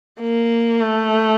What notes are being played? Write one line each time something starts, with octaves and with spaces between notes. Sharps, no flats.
A#3
A3